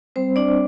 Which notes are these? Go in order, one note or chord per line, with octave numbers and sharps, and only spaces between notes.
G3 C4 C5
D4 D5